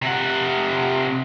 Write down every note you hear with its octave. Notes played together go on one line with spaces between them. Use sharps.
C3 F#5